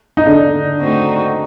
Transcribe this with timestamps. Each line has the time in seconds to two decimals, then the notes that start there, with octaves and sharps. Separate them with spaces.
0.17 D#4
0.26 D3 D4
0.81 A3 C4 D#4 F#4